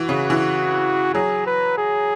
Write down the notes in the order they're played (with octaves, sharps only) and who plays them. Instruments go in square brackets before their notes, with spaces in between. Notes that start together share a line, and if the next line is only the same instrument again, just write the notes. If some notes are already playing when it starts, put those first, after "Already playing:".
Already playing: [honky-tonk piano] E3 [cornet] F#4
[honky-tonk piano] C#3
E3
[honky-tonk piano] F#3 [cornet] G#4
[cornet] B4
G#4